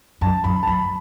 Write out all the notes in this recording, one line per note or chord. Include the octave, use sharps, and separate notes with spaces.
F#2 A5
F#2 B5
A5
F#2 B5